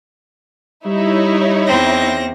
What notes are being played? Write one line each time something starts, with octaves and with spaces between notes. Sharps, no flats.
G3 D#4 E4 C#5
E2 C4 A#6